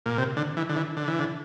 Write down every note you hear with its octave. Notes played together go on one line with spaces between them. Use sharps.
A#2
C3
D3
E3
D3
E3
D3
E3
D3